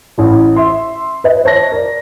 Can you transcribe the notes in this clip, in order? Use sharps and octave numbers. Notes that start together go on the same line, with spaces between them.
A1 A2
E5 C6
B4 D#5
C5 C#5 A5 A#6
A#4 D5